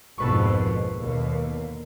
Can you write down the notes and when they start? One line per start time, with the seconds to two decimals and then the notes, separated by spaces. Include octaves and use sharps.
0.18 A#1 F2 G#2 B2 F3 A4 B4 C#6
0.98 D#2 B2 D3 A#3